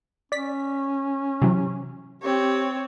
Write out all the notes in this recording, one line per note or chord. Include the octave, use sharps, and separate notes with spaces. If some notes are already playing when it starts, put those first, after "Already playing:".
C#4 D5 B6
C3 E3 F#3
C4 G4 C#5